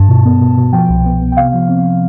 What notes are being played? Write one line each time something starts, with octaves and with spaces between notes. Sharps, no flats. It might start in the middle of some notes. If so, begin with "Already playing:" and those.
Already playing: G2 A5
B2
B3
B2
B2
F3 G5
C2
B3
B3
G5
C3 F5
F3
C4